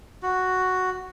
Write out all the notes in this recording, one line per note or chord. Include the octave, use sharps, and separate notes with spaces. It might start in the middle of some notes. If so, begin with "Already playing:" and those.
F#4